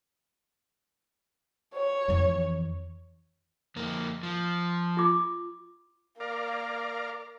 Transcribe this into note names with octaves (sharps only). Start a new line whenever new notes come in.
C#5
F2 E3
F2 A#3
F3
F4 D6
A#3 A#4 D5 F5